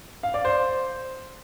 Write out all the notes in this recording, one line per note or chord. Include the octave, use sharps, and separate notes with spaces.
F5
D5
C5